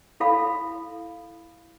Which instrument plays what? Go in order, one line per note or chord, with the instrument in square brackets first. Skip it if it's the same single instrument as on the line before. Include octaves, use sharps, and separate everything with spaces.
[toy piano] E4 A4 F5 B5